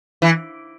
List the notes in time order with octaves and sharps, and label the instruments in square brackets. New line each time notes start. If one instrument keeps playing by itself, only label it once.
[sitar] E3